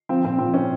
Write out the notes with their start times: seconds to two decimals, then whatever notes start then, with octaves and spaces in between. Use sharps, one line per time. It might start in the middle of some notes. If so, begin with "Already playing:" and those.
0.09 F3 C4
0.24 A#2 C4
0.39 F3 C4
0.53 A#2 C#4